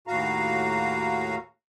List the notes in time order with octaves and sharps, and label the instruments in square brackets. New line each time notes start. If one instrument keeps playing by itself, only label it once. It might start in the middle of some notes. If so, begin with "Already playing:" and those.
[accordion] D#2 A2 F#4 F5 A#5